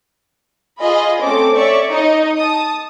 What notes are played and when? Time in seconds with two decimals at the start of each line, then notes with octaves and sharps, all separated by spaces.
0.80 F4 G#4 D#5 B5
1.22 A3 C4 C#4 A4 D6
1.56 C#5 D5 E5 C#6
1.89 D#4 D#5
2.37 A5 D#6